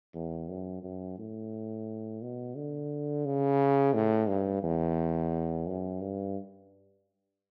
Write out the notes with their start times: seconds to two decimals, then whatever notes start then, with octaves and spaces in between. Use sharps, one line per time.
0.15 E2
0.49 F#2
0.84 F#2
1.18 A2
2.22 B2
2.57 D3
3.26 C#3
3.94 A2
4.28 G2
4.63 E2
5.67 F#2
6.01 G2